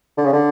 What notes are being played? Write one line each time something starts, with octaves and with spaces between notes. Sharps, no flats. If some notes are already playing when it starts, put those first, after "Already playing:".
D3
C#3
D3